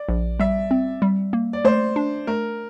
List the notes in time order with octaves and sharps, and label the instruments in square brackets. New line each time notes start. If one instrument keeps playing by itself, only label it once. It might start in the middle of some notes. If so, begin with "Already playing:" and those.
Already playing: [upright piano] D5
[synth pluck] A#1
[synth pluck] G3 [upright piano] E5
[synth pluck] C4
G3
A#3
[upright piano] D5
[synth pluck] A3 [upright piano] C5
[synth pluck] D4
[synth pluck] A3 [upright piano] A#4